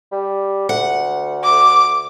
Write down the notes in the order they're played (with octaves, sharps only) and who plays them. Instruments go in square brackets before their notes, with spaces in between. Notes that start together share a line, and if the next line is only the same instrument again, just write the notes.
[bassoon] G3
[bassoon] D2 [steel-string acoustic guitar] F#5
[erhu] D6